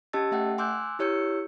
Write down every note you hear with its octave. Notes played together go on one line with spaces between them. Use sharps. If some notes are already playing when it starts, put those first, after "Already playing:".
C#4 G4 D#5 A5 E6 A6
A3 E5 F#5 G5
G#5 C6 D6 E6 F#6 G6
E4 G4 C#5 E6 G6 C#7